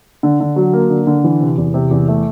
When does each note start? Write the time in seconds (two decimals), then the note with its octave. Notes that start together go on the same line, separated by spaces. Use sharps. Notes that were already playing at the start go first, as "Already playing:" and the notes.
0.23 D3
0.40 D3
0.56 F#3
0.73 A#3
0.90 D3
1.07 D3
1.24 E3
1.41 C3
1.58 E2
1.74 C3
1.91 E2
2.08 A3